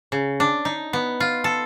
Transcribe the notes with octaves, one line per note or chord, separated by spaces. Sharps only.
C#3
D4
D#4
B3
F4
A4